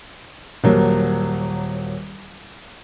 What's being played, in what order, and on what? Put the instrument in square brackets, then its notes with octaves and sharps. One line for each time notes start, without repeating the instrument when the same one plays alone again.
[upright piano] D#1 F#3 A#3